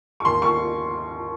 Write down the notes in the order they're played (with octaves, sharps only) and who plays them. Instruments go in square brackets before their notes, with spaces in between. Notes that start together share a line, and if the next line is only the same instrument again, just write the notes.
[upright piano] C#6
D#2 C6
D#2 C#6